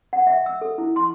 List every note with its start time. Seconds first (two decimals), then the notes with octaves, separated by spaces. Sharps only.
0.13 F#5
0.27 E5
0.46 E6
0.61 A4
0.78 E4
0.96 C6